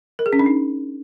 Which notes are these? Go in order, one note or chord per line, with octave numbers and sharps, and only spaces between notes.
A#4
G#4
C#4
D4
D#4